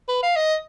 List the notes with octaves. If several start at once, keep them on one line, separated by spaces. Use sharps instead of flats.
B4
F5
D#5